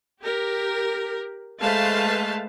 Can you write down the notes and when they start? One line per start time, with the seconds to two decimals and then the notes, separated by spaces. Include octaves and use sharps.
0.21 G4 A#4
1.60 G#3 A3 B4 C5 F5 A5